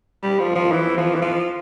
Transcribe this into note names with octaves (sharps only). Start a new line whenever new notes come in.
G3
F3
F3
E3
F3
E3
F3